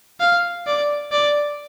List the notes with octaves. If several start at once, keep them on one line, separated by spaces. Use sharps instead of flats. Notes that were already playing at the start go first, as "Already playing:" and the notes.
F5
D5
D5